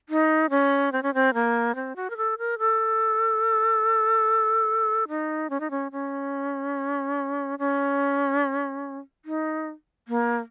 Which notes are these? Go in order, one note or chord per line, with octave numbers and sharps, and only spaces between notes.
D#4
C#4
C4
C#4
C4
A#3
C4
F#4
A#4
A4
A#4
A4
D#4
C#4
D#4
C#4
C#4
C#4
D#4
A#3